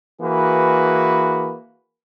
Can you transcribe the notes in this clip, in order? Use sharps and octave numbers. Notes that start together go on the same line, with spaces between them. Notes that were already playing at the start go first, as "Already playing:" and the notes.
E3 A#3 F#4 G#4 B4